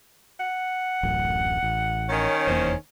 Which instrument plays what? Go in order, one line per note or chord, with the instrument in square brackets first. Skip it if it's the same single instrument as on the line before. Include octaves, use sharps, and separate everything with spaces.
[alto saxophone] F#5
[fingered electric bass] D1 A1 F#2
A1
[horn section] D#3 C#4
[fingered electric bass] F1 E2 A#3 [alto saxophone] C5